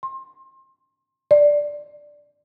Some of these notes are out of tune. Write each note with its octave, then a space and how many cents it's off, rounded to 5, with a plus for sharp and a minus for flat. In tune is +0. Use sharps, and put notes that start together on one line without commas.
C6 +30
D5 +0